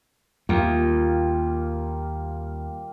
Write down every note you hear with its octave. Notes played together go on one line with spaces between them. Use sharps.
D#2 G3 A#3 F4